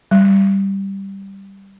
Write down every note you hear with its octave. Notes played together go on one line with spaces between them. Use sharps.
G3